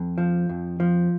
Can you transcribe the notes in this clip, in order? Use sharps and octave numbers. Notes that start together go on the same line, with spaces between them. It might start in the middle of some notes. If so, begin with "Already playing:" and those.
Already playing: F2
F3
F2
F3